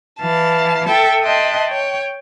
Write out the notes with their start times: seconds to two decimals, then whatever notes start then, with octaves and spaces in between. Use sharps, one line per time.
0.21 E3 F5 A5
0.86 A4 E5 G5 A5
1.22 D#5 E5 G5 A5 C6 F#6
1.66 C#5 G5